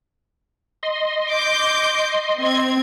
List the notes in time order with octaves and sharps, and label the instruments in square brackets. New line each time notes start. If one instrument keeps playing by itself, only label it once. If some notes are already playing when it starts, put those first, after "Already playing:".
[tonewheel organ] D#5 C6
[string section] D6 G6
C4 G#6